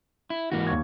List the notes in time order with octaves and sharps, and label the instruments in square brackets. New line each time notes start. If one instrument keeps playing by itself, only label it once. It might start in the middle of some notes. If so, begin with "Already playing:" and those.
[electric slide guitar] E4
[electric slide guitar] G#2 A#3 F#4 [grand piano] E3
[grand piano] D#2 C#6 G#6